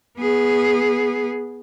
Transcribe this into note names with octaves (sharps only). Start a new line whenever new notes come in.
B3 G#4